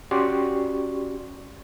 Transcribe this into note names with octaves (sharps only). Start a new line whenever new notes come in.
C#4 F#4 G4 D5 C6 C#6